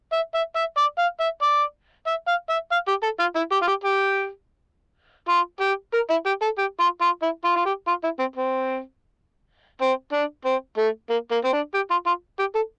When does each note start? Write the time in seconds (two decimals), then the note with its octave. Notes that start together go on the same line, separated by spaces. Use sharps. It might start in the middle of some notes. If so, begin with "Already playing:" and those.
0.13 E5
0.34 E5
0.56 E5
0.77 D5
0.99 F5
1.20 E5
1.42 D5
2.07 E5
2.28 F5
2.50 E5
2.72 F5
2.88 G4
3.03 A4
3.19 F4
3.35 E4
3.52 G4
3.62 F4
3.67 G4
3.84 G4
5.29 F4
5.61 G4
5.94 A#4
6.10 E4
6.26 G4
6.42 A4
6.58 G4
6.80 F4
7.01 F4
7.22 E4
7.44 F4
7.56 F4
7.65 G4
7.87 F4
8.04 E4
8.19 C4
8.36 C4
9.81 C4
10.13 D4
10.45 C4
10.78 A3
11.10 A#3
11.31 A#3
11.44 C4
11.53 D4
11.74 G4
11.90 F4
12.06 F4
12.39 G4
12.55 A4